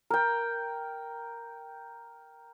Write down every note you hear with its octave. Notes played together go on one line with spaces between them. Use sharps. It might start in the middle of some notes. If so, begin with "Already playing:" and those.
A#4 G5